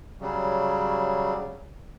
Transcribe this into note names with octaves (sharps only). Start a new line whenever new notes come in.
C#3 F#3 G3